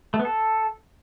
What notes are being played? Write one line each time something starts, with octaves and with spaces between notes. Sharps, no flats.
A3
B3
A4